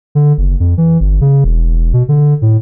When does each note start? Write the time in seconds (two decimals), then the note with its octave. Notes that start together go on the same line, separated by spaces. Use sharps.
0.15 D3
0.38 F#1
0.60 F2
0.77 E3
1.00 G1
1.21 C#3
1.44 E1
1.93 B2
2.09 D3
2.42 A2